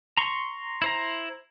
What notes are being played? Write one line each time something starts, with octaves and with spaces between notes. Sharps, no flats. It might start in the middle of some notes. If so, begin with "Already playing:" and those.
A#5 C6 C#6
E4 C5 A#5